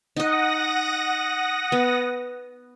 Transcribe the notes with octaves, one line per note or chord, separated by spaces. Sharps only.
D#4 D#5 F#5 D#6 A#6
B3